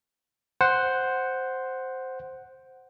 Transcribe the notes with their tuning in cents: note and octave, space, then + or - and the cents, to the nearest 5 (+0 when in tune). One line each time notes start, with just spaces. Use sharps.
C5 +0 F#5 +0